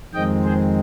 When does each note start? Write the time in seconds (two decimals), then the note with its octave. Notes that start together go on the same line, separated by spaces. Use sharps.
0.13 F2 D#3 G#3 C4 D#5 G5
0.44 G#4 C5